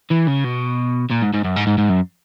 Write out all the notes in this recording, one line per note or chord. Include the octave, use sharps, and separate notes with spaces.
E3
C#3
B2
A#2
G#2
G#2
F#2
G#2
G#2
G#2
F#2